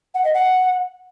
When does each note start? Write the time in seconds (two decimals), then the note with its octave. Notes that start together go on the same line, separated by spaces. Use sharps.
0.14 F#5
0.24 D#5
0.34 F#5